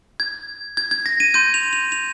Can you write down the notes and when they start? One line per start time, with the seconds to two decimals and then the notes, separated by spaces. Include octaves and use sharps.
0.20 G#6
0.77 G#6
0.91 G#6
1.06 A#6
1.20 D#7
1.34 C6 G6 D#7
1.54 F7
1.73 F7
1.92 F7